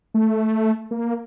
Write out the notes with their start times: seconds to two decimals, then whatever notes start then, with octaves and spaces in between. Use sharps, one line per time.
0.14 A3
0.91 A#3